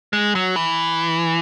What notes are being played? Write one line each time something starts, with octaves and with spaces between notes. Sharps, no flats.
G#3
F#3
E3